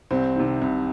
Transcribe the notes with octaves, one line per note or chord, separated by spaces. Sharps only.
C2 C4
C3 D#3
C2